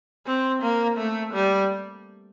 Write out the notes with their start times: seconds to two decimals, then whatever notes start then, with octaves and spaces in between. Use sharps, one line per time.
0.26 C4
0.62 A#3
0.98 A3
1.34 G3